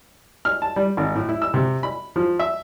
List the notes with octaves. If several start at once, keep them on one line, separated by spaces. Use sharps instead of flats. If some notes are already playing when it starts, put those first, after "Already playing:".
F6
A5
G3
G#1
A2
E4
E6
C3
B5
F3
E5